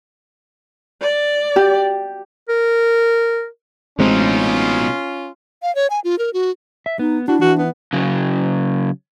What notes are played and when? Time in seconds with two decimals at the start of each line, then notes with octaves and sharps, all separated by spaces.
1.01 D5
1.56 G4
2.49 A#4
3.99 A1 B2 G#3 C4 C#4 D#4 F4
5.62 F5
5.75 C#5
5.90 G#5
6.04 F4
6.19 A#4
6.34 F#4
6.86 E5
6.99 B3 D#4
7.28 D4 E4 F#4
7.41 E3 F#4
7.59 B3
7.93 C#3 F#3